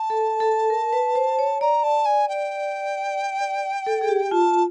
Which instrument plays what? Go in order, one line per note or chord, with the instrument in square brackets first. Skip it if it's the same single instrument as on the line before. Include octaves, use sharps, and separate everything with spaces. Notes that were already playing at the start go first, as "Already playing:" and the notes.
Already playing: [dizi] A5
[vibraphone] A4
A4
A#4
B4
C5
C#5
[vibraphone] D5 [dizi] A#5
[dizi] A5
G#5
G5
[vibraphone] D5
A4
G#4
G4
[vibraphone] F4 [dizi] A5